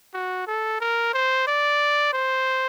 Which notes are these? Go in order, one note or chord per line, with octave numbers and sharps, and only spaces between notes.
F#4
A4
A#4
C5
D5
C5